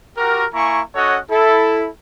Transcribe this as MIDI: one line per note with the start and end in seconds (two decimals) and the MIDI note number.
0.17 0.45 66
0.17 0.45 67
0.17 0.45 70
0.53 0.81 58
0.53 0.81 64
0.53 0.81 80
0.53 0.81 82
0.53 0.81 85
0.96 1.18 61
0.96 1.18 66
0.96 1.18 69
0.96 1.18 73
0.96 1.18 75
0.96 1.18 78
1.30 1.87 64
1.30 1.87 69